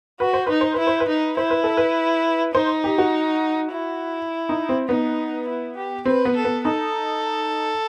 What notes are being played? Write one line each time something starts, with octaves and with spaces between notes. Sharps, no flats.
F#4 B4
C5
D#4 B4
C5
E4 B4
C5
B4
D#4
E4 C5
B4
A4
B4
D#4 C5
G4
F#4
E4
D#4
C4
B3 D#4
E4
G4
C4 B4
B3
A4
B3
D#4 A4